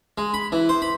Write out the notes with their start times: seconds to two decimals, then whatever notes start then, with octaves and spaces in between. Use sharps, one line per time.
0.18 G#3
0.34 B5
0.52 E3
0.69 C5
0.82 B5